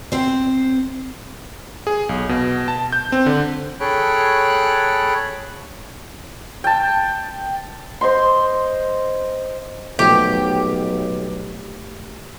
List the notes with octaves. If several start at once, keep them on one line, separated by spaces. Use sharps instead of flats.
C4 C5
G#4
B1
B2
A5
G6
C4
D3
G#4 A4 C#5 G5 B5 F#6
G5 A5
C5 D#5 C6
B1 A#2 F3 A3 G4